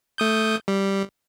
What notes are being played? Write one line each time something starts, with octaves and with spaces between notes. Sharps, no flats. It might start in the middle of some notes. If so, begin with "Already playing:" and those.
A3 D#6 G6
G3